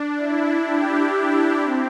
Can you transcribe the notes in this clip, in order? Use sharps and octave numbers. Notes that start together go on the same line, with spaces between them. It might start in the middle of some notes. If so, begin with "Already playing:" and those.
Already playing: D4
E4
G4
D4
C4